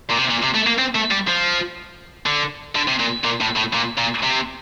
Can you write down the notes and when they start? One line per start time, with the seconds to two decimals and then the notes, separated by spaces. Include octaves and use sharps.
0.10 A#2
0.18 C3
0.30 A#2
0.42 C3
0.54 A3
0.67 A#3
0.79 C4
0.95 A3
1.11 G3
1.28 F3
2.26 D3
2.75 D3
2.88 C3
3.00 A#2
3.25 A#2
3.41 A2
3.57 A2
3.74 A#2
3.98 A#2
4.23 C3